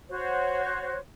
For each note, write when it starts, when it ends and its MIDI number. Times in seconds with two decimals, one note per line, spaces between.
0.09 0.98 66
0.09 0.98 72
0.09 0.98 73